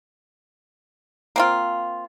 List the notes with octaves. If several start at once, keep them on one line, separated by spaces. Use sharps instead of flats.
A#3 C4 F4